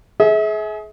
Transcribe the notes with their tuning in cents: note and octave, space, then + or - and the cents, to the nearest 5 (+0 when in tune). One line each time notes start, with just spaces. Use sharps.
G#4 +30 E5 -35